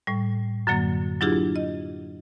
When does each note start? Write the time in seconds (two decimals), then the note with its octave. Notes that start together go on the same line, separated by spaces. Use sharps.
0.07 A2 G3
0.67 F#2 D3 F#3 A#3
1.21 F#3 D4 E4 F4 G4 G#4
1.56 D#5